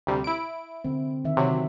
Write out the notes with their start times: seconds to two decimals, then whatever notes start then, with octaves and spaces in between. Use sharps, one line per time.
0.07 D2 C3 G3
0.24 E4 D7
0.84 D3 C4
1.25 D#3 E5
1.37 C3 F#3